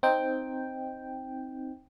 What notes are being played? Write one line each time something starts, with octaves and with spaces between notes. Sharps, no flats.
C4 D#4 G5